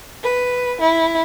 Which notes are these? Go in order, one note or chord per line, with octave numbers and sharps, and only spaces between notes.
B4
E4